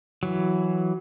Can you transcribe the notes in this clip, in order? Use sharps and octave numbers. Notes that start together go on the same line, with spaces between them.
E3 F#3